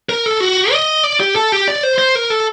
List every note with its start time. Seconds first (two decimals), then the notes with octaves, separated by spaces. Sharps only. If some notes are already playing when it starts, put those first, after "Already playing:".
0.09 A#4
0.26 A4
0.40 F#4
0.72 D#5
1.04 D5
1.20 G4
1.35 A4
1.52 G4
1.68 D5
1.83 C5
1.98 C5
2.15 A#4
2.30 A4